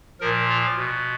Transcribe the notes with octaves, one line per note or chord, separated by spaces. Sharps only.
A#2 F3 A#4
F4
B2